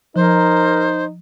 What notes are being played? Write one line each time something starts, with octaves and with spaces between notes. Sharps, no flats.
F3 D#4 A#4 C5